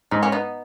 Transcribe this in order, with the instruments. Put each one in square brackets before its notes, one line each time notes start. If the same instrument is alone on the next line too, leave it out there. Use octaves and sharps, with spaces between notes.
[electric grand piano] G#2 [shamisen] D#4
[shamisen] C#4
B3 D#4